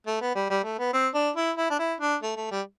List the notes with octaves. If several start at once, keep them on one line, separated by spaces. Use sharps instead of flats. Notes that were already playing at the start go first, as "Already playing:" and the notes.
A3
B3
G3
G3
A3
B3
C4
D4
E4
E4
D4
E4
D4
A3
A3
G3